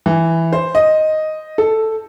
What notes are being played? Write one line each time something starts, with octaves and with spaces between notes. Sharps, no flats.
E3
C5
D#5
A4